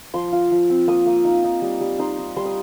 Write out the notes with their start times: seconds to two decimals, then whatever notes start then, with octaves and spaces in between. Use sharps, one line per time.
0.14 F3 C6
0.32 F4
0.51 F3
0.70 C4
0.87 A#3 D#6
1.06 A#3
1.25 D#4
1.44 D#4
1.62 G3
1.81 G3
1.99 D#4 C6
2.19 D#4
2.36 G3 C6
2.45 D#6